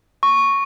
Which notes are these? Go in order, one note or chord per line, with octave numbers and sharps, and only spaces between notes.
C#6